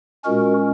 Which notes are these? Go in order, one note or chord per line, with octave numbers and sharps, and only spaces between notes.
A#2 G#3 C#4 F#4 A#4